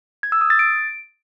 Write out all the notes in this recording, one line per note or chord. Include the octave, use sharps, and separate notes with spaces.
G#6
E6
D#6
A6
D7